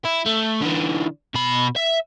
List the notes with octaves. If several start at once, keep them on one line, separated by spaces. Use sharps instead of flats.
E4
A3
D3 E3
B2 B5
E5